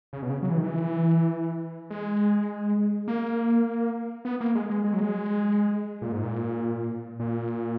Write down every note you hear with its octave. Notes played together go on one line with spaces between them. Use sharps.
C#3
B2
C#3
F#3
E3
D#3
E3
G#3
A#3
B3
A#3
G#3
G#3
G#3
F#3
G#3
A#2
G#2
A#2
A#2